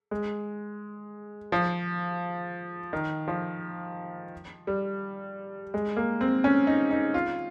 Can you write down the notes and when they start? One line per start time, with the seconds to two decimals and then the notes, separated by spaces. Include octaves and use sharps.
0.11 G#3
1.52 F3
2.93 D#3
3.28 F3
4.67 G3
5.74 G#3
5.97 A#3
6.21 C4
6.44 C#4
6.67 D#4
6.91 D#4
7.14 F4